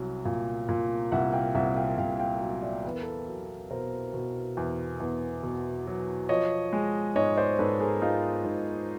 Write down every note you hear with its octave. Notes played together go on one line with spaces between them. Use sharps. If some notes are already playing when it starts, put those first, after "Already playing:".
Already playing: C2 F#3
A#2
A#2
C2 E5 F#5
F5 G5
C2 E5 F#5
F5 G5
C2 F5 G5
F5 G5
F#3
D5 E5
E2 B4
A#4
A4 B4
F#3
B2 A#4 C5
B2
E2
E2
B2
F#3
F3 C#5 D#5
G#3
G#2 C#5 D#5
C5 D5
G#2 A4 B4
G#4 A#4
G#3 D#4 F4
G#2